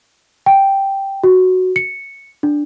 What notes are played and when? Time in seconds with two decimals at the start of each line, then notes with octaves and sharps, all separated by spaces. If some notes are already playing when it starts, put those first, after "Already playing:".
0.46 G5
1.24 F#4
1.76 C#7
2.43 D4